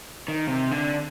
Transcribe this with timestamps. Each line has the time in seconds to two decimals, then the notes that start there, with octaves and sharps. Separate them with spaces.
0.28 D#3
0.48 C3
0.71 D3